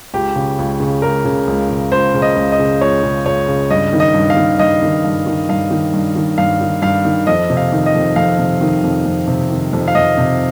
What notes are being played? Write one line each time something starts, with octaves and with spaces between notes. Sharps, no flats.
C#2 G4
C#3
C#2
C#3
C#2 A#4
C#3
C#2
C#3
C#2 C5
C#3
D#5
C#2
D#5
C#3
C#2 C#5
C#3
C#2 C#5
C#3
G2 D#5
D#3
D#5
G2
F5
D#3
G2 D#5
D#3
G2
D#3
G2 F5
D#3
G2
D#3
G2 F5
D#3
G2 F5
D#3
F2 D#5
C3
F5
D#3
D#5
F2
F2 F5
C3
D#3
F2
F2
C3
D#3
F2
F5
F2 D#5
C3